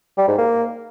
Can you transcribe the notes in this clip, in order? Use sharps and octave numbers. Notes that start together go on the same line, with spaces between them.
G3
G#2
A#3